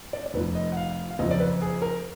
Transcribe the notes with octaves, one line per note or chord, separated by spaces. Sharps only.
D5
D5
F1 F2 F3 B4
D#5
F#5
F5
F5
F#1 F2 F3 D#5
D5
B4
G#4
A#4